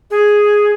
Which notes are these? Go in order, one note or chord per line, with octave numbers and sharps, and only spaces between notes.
G#4